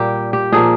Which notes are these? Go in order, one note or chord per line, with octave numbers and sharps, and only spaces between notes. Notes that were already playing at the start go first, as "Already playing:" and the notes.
Already playing: A#2 G3 A#3 G4
G4
A#2 F3 A#3 G#4